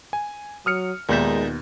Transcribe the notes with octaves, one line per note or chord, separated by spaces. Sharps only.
G#5
F#3 D#6 F6 C#7
D#2 A#2 G#3 B3 D#4 E5 G6